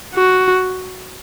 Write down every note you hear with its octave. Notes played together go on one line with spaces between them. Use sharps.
F#4